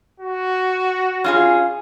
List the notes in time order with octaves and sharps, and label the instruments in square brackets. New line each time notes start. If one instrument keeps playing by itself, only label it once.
[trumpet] F#4
[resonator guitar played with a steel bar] C#4 F4 G#4